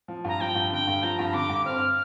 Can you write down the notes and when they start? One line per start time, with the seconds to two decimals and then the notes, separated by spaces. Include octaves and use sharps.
0.08 F3
0.24 G2 A#5
0.40 F3 G5
0.55 G2
0.72 D3 G5
0.87 G2
1.03 F3 A#5
1.19 G2
1.34 D3 D6
1.49 G2
1.66 C4 F6